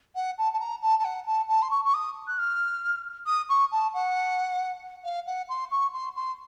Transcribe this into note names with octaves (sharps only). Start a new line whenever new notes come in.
F#5
A5
A5
A#5
A5
A5
F#5
A5
A5
C6
C#6
C#6
D#6
F#6
F6
D#6
C#6
A5
F#5
F5
F#5
C6
C#6
C6
C6